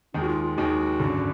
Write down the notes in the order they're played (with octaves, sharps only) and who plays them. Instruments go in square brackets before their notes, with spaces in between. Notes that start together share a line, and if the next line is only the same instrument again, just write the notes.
[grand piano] D#2 D#3 G#3 [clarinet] D#4
[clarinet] F#4
F4
F4
[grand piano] D#2 D#3 G#3 [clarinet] F#4
[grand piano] G#1 F#2 D3